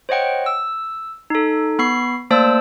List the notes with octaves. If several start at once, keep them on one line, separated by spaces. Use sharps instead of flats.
C5 C#5 D#5 F#5 G5
E6
D#4 A4
B3 B5 C#6 C7
A3 A#3 C5 D5 A5 E6